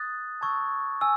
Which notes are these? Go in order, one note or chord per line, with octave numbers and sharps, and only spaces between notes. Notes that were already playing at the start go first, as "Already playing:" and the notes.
Already playing: D#6 F#6 A6
A5 C#6 E6 G#6
G#5 E6